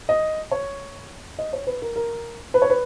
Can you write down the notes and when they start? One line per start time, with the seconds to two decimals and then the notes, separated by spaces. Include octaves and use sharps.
0.09 D#5
0.51 C#5
1.39 D#5
1.53 C#5
1.67 B4
1.82 A#4
1.96 A#4
2.54 B4
2.62 C#5
2.70 B4